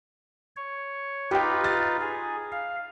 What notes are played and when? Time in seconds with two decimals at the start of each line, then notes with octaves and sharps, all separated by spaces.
0.56 C#5
1.31 D#4 F4 G4 B4 G5
1.64 A6
2.01 G#4
2.52 F5